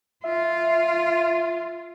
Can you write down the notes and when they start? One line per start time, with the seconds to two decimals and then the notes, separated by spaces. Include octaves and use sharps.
0.24 F4 E5